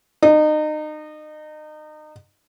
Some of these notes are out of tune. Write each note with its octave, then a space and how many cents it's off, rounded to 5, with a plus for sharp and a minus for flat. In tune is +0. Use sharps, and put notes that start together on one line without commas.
D#4 -30